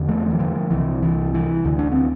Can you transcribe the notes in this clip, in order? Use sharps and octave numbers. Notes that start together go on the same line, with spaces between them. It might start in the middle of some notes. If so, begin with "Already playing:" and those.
Already playing: E2 D3
F3 A3
E3
D3 F3
C2 C3 E3
E3
E3
D2 D3
D4
C4